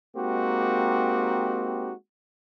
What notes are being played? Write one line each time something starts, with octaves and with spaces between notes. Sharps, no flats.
G#3 A#3 C4 D#4 F#4 G4